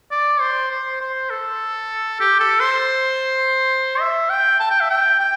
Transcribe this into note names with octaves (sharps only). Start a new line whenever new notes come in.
D5
C5
C5
C5
A4
G4
A4
C5
E5
G5
A5
G5
E5
G5
G5